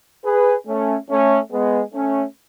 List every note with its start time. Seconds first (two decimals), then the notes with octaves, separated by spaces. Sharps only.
0.25 G#4 B4
0.67 A3 C#4
1.09 A3 C#4
1.52 G#3 B3
1.94 A3 C#4